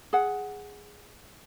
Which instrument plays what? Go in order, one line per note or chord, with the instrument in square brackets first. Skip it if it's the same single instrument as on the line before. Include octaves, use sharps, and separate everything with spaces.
[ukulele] G#4 F#5